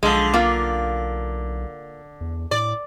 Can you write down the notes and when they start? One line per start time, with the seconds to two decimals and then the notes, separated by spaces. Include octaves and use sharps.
0.03 B1 D3 F3 G#3
0.34 A#3 F4
2.21 E2
2.51 A2 D5